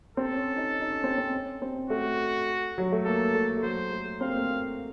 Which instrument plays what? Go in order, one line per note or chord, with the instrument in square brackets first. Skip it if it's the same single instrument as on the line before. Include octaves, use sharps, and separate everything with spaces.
[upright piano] C4 [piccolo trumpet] A4
[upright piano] C#4
D#4
D#4
C#4
C4
C4
C#4
C4
[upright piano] A3 [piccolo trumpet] F#4
[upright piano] F#3
A3
[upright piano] A#3 [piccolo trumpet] A4
[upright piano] A3
A3
[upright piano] F#3 [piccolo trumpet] C5
[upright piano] A3
[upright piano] C4 [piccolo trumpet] F5
[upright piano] A#3
A3
A#3